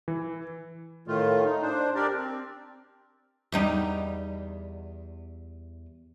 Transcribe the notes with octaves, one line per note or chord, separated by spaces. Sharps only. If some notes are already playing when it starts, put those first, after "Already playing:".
E3
A2 D#3 A3 F4
D#4
D4 C5
D4 G4 A#4 D5
C4
E2 G3 D#4